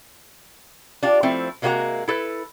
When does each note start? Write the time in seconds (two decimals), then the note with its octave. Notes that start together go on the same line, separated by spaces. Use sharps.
1.03 D4 F4 G4
1.23 F3 A3 C4 E4
1.62 C3 G#3 A#3 D#4 F#4 A#5
2.08 E4 A4 B4